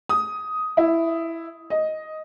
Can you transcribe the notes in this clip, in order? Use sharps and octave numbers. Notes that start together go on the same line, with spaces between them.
D#6
E4
D#5